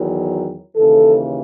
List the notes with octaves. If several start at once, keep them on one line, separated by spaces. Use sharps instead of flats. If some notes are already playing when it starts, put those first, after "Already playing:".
Already playing: E2 D#3 F#3
D#2 C#3 E3 A4